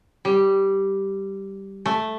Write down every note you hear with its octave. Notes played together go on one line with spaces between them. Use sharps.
G3
A3